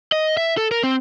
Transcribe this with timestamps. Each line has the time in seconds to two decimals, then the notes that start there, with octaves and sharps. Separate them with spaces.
0.12 D#5
0.37 E5
0.57 A4
0.71 A#4
0.84 C4